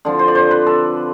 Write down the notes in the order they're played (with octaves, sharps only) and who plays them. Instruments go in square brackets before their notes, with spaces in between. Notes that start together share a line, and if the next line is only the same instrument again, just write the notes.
[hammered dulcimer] D3 F3 C4
C5
D5
C5
B4
A4